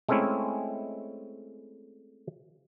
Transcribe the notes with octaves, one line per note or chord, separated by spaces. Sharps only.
G#3 A3 C4 C#4 E4